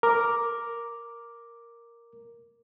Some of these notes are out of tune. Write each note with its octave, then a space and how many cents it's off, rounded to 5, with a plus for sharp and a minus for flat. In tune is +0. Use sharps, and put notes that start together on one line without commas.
A#4 +0 D6 +0